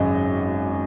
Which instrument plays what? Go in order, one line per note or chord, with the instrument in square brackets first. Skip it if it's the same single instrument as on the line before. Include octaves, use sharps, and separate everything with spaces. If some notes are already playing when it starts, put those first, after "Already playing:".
Already playing: [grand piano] G#1 F#2 C#3 F#3 D#5